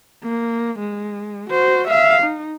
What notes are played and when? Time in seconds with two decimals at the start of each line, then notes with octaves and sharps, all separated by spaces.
0.23 A#3
0.79 G#3
1.50 F#4 C5
1.87 E5 F5
2.22 D#4